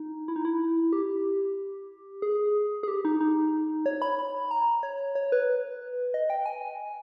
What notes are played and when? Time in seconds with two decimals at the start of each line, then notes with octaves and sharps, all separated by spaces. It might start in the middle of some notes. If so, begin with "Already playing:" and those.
Already playing: D#4
0.28 E4
0.36 D#4
0.45 E4
0.93 G4
2.22 G#4
2.83 G#4
2.88 G4
3.05 D#4
3.21 D#4
3.86 C#5
4.02 B5
4.19 B5
4.51 A#5
4.83 C#5
5.15 C#5
5.32 B4
6.14 D#5
6.30 G5
6.46 G#5